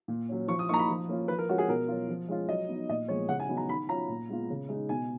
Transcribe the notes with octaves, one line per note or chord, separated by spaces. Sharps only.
A#2
F#3 C#4
F3 C#6
D#6
A#3 D#4 A#5 C#6
B5
F3
A#3 C#4 F4
F3 B4
A#4
G#3 C#4 F4 F#4
G#4
B2 A#4
F#3 C#4 F4
F3
G#3 C#4 F4
F#3 D#5
B3 D#4
A#2 D#5
F3 G#3 B3 C#5
C#3 F#5
G#5
F#3 B3 D#4
A#5
D#3 B5
F#3 C#4 F4 A#5
A#2
G#3 B3 F4
C#3
G#3 D#4
B2 G#5